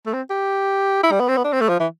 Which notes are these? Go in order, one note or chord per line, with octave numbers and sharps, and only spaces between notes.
A3
C4
G4
E4
G3
B3
C4
B3
D4
C4
A3
F3
E3